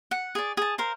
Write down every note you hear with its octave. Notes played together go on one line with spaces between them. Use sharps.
F#5
G#4 D5
G#4 A5
A#4 C5 F5